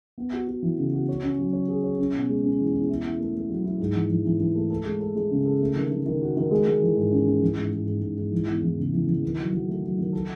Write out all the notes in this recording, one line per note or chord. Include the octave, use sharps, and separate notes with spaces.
B3
F#4
F#4
E3
C#3
F#4
C#5
C#4
F#3
C#5
G#4
C#5
C#4
B2
G#3
C#4
E2
E2
E4
E4
A3
A3
F#3
E4
G#2
E3
E3
E3
E3
A3
A4
G#3
A4
G#3
C#3
A4
A3
D#3
D#3
D#3
F#4
D#3
G#3
G#3
E3
G#2
C#4
C#4
E3
G#2
G#2
G#2
G#2
G#2
E3
E2
E3
C#3
E3
E3
D#3
F#3
F#3
A3
F#3
D#3
A4